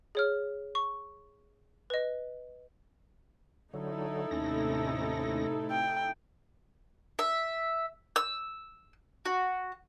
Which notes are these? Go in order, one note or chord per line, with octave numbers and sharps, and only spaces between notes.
G#4 C#5 F6
C#6
B4 D#5
D3 F#3 D#4 E4 A4
D#2 A2 C3 C#4 A#6
G5
E5
E6
F#4